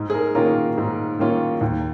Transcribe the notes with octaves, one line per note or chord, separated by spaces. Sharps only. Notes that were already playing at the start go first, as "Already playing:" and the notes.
Already playing: G#2
G#4
A#4
D#3 A#3 C#4 F4 A#4
G#2
D#3 A#3 C#4 F4
D#2